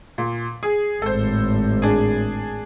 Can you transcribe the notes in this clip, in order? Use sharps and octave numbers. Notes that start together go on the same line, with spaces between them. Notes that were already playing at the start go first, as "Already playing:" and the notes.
A#2
G#4
G#1 A2 A4 C5
D4 G#4